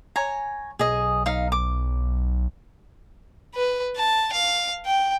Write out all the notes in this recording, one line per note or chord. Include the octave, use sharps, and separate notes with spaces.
C#5 G#5 A#5
B1 G#4 D#5
D#4 F5
D6
B4
A5
F5
G5